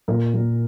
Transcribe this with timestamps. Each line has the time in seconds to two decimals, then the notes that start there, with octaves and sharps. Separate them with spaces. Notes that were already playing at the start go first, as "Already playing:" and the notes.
0.08 A#2 A#4
0.34 A#2